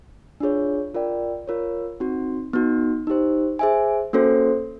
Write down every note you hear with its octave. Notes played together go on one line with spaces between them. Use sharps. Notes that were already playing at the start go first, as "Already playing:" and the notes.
D4 F4 G#4 C#5
F4 A#4 D5 G5
F4 A#4 C#5
C4 D#4 F#4
B3 D#4 F#4
D#4 G4 C5
G#4 C5 E5 G#5
A#3 C#4 F#4 A4 C5